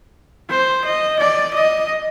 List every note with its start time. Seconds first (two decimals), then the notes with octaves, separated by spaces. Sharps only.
0.51 C5
0.85 D#5
1.20 D5
1.54 D#5